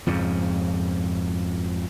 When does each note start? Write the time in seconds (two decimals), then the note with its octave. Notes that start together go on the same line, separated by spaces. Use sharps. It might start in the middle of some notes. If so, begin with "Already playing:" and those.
0.07 F2 G#2 C#3